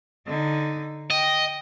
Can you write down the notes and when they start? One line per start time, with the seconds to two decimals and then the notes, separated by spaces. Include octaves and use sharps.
0.26 D3 D#4
1.10 D#5 G5